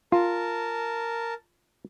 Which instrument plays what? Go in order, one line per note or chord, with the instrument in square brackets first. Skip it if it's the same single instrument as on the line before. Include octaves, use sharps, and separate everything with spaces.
[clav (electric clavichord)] F4 [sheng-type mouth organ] A#4 A5